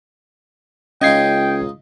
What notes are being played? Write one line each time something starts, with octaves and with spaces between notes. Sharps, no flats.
C#2 C#4 D#4 F4 D#5 G5 G#6 C7